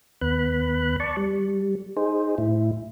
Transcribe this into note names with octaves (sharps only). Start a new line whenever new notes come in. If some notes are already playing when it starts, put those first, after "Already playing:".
D#2 B3 B5 F#6
D5 A5 C#6
G3
D#4 G#4 C5
A2 E4